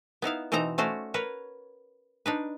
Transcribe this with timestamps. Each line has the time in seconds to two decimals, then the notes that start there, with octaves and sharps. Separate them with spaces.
0.22 B3 D#4 E4 F5
0.52 B2 E3 C4 D#4 C5 A#5
0.78 A3 C#4 F#4 C5 D5
1.14 A#4 B4 C#5
2.26 D4 D#4 B4